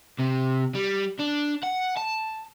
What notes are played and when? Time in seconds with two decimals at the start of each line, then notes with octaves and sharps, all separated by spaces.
0.19 C3
0.75 G3
1.19 D4
1.63 F#5
1.97 A5